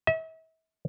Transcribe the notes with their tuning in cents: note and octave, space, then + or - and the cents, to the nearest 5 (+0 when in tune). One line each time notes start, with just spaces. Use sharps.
E5 -40